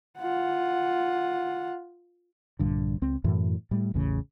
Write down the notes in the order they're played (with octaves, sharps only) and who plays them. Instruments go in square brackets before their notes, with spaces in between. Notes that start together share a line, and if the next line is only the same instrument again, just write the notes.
[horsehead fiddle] F4 F#5
[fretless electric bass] A#1 G2 D3
C#2 C4
F#2 A2 E3
A2 G3
A1 E2 A2 C#3